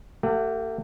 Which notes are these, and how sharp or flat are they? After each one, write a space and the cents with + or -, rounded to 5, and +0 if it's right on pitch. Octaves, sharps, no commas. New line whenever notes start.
A3 +40 G4 -15 F#5 +25